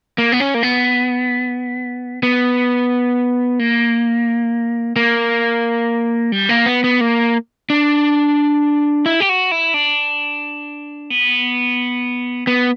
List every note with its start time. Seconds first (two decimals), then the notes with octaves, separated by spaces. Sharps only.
0.18 A#3
0.32 B3
0.40 C#4
0.54 A#3
0.63 B3
2.23 B3
3.59 A#3
4.96 A#3
6.32 G3
6.49 A#3
6.66 B3
6.84 B3
7.01 A#3
7.70 D4
9.06 E4
9.20 G4
9.29 F#4
9.51 E4
9.74 D4
11.10 B3
12.47 B3